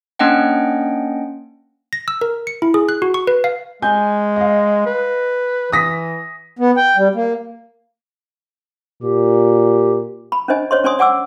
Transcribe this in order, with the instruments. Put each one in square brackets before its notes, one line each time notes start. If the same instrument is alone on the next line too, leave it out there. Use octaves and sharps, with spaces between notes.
[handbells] A#3 C#4 D4 D#5 F#5 G5
A#6
E6
A#4
C#7
E4
G#4
F#6
F#4
C#6
B4
F5
[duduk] G#3 [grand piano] G#5 G6
[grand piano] D#5 F5
[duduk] B4
[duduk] E3 [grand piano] D#6 A#6 B6
[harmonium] B3
G5
G3
A#3
[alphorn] A#2 [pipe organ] G4
[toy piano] B5
C#4 D4 C5 D#5 G#5
C5 C#5 D#5 C6
C#4 C5 D5 G#5 C6 D#6
D5 F#5 G#5 D6 E6